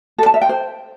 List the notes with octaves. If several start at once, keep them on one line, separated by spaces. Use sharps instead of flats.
A4
A5
E5
G5
C5